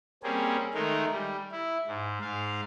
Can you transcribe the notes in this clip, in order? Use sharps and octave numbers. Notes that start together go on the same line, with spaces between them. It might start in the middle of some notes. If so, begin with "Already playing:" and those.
G3 A#3 C4 C#4 G#4
D#3 G#3 A3 D#4 A#4
G3
E4
G#2
G#2 F5